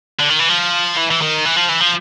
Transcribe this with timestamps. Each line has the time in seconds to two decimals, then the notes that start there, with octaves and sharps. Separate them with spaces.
0.20 D3
0.30 D#3
0.40 E3
0.50 F3
0.97 E3
1.11 E3
1.22 D#3
1.45 E3
1.56 F3
1.69 E3
1.80 F3